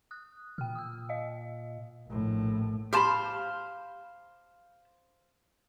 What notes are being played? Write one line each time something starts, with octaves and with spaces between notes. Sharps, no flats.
D#6 F#6
A#2 G5 F6
D#6 E6
D#5 F5
A#1 A2
G4 C5 F5 A5 B5